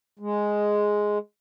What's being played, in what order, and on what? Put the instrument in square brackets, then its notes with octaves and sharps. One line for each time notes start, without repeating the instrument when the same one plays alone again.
[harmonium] G#3